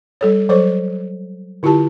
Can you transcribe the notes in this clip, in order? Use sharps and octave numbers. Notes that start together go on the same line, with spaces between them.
G3 A4 C#5
F#3 A4 C5 C#5 C#6
D3 E4 F4 G4 A5